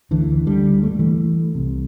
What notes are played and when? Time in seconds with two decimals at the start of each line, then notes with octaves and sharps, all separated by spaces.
0.11 D2 D3 E3
0.47 D3 G3
0.83 A3
0.91 G3
0.99 E3 A3
1.55 C2 C3